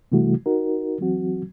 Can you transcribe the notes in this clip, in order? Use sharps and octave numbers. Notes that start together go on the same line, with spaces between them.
C3 E3 G3 A3 E4 F#4
D#4 F#4 A#4
E3 F#3 C4 F#4